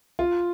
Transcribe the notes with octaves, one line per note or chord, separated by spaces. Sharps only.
F4